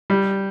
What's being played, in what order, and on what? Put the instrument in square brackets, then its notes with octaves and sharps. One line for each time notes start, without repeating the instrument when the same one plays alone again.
[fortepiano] G3